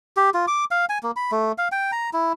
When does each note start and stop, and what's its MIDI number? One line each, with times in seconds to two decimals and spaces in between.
0.17 0.30 67
0.34 0.46 65
0.47 0.65 86
0.71 0.85 77
0.89 0.98 80
1.03 1.11 58
1.16 1.31 83
1.31 1.52 57
1.58 1.68 77
1.72 1.91 79
1.92 2.10 82
2.13 2.33 64